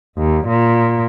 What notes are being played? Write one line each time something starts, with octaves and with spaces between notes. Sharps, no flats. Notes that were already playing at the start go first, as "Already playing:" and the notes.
D#2
A#2